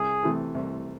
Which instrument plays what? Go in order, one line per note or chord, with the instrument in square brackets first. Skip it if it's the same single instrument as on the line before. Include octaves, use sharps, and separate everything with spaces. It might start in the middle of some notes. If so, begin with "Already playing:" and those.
Already playing: [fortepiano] C2 [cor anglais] G#4
[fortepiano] C3 E3 A3
C2